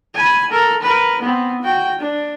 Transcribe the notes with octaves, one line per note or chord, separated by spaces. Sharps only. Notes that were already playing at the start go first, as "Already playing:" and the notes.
G#5 B5
A4 A#4
A#4 B4
B3 C4
F#4 G5
D4